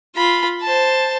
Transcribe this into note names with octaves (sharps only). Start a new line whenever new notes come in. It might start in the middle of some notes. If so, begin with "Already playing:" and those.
F4 B5
C5 A5